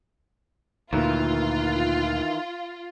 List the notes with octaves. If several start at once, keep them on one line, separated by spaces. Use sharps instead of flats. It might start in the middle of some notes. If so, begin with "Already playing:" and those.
D2 A#2 D#3 E3 F4